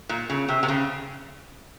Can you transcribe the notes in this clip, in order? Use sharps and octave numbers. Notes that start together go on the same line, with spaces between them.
A#2
C#3
C3
C3
C#3